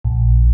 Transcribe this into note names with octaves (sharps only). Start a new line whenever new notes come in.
A#1